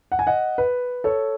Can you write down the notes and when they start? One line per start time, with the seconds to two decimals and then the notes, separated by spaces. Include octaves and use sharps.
0.12 F#5
0.19 G#5
0.27 D#5 F#5
0.58 B4
1.04 A4 C#5